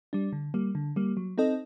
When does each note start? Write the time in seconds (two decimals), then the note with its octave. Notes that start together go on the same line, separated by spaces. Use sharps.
0.13 G3 D4
0.33 D3
0.54 G3 A#3
0.75 D3
0.96 G3 A#3
1.17 F#3
1.38 C4 D#4 A4 D#5